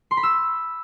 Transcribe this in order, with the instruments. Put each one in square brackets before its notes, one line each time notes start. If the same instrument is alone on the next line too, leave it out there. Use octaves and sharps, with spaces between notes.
[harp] C6
B5
E6